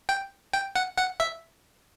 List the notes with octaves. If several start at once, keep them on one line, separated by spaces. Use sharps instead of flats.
G5
G5
F#5
F#5
E5